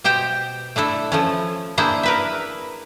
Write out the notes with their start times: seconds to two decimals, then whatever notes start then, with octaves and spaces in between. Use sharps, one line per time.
0.04 B2 G4 C5 G5
0.76 A3 D4 E4 A4
1.12 F3 A3 C#4
1.78 A#3 D4 E4 G#4 C5
2.03 A#4 B4 E5